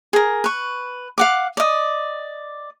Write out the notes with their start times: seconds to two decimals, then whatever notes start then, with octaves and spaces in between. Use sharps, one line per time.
0.13 G#4 A#4
0.44 B4 C#6
1.18 F5 F#5 D6
1.57 D5 D#5